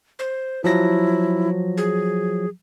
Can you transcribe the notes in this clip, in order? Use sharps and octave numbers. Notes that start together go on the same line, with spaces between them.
C5
F3 F#3 E4 A#6
G#4